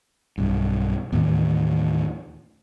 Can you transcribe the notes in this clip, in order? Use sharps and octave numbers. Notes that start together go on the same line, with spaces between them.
B1 G2
D#2 A2 E3